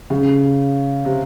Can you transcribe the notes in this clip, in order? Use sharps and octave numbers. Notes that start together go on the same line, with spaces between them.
C#3
C3